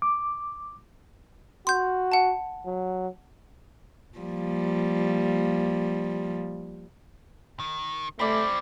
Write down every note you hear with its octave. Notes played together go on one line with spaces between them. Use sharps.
D6
F#4 C6 G6
F#5 A5
F#3
F3 G3 A#3
D#3
G3 A3 C4 D5 B5